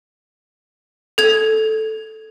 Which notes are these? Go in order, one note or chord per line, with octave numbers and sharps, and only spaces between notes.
A4 G#6